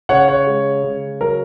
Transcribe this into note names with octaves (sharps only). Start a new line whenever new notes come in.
C#3 C#5 F#5
C#5
G#3
C#3
F#3 A#4